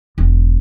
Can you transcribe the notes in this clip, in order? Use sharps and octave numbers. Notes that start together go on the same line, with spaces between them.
E1